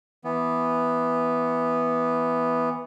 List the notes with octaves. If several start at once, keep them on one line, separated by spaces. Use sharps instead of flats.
E3 B3